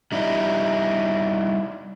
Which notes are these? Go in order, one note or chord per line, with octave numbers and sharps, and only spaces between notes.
G3 D#4 E4